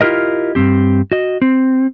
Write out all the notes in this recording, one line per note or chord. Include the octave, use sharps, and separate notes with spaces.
E4 F4 G4 A#4 D#5
G2 C3 C4 G4
F#4 D#5
C4